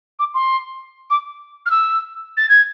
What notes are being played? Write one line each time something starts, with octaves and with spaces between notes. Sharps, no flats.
D6
C6
D6
F6
E6
A6
G#6